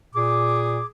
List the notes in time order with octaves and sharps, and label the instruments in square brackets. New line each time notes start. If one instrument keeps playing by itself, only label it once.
[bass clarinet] A#2 [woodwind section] G#4 D6